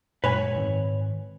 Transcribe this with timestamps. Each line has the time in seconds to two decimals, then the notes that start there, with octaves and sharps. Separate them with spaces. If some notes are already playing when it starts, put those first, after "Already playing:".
0.24 F#2 A#2 G#3 B4 C#5 G#5
0.56 G#2 D#3 C4